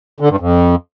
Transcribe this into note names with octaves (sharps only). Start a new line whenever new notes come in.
D3
G2
F2